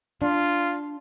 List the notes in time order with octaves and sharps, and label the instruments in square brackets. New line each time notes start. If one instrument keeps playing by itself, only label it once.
[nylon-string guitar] D4 [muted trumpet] F4